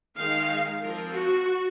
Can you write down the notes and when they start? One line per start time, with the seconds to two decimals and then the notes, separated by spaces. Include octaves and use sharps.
0.16 D#3 G#3 D#4 F5
0.81 F3 C4 F4 A#4
1.14 F#4